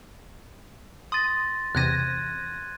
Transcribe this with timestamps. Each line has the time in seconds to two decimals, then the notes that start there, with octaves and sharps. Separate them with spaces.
1.12 C6 D#6 A6 A#6
1.75 E2 C3 F#6 G#6 A#6 D#7